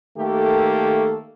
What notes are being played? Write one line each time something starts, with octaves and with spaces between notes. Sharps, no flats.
D#3 A3 A#3 G4 A4